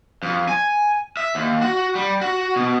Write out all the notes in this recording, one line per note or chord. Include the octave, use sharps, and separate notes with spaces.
F2
G#5
E5
D#2
F#4
G3
F#4
B2